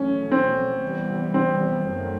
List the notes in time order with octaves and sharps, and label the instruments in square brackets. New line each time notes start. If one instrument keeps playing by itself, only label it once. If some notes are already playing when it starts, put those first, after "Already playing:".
Already playing: [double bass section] E2 B2 F#3 A3 [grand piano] C#4
[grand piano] C4
[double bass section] C3 E3 G3 B3
[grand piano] C4
[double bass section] F#2 D#3 F#3 A3